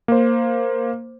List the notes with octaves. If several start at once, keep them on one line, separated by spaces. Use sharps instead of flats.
A#3 C5